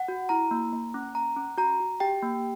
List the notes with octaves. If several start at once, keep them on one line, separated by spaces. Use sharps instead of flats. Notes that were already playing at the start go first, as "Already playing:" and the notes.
Already playing: F#5
F#4
E4 A#5
A#3
A#3
C#4
C#4 A#5
C#4
F#4 A#5
F#4
G4 G5
A#3